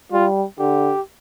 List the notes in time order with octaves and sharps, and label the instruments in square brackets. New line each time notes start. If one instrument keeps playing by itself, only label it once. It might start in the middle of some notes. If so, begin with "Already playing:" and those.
[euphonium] G3 [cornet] F4
[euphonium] D3 [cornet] G4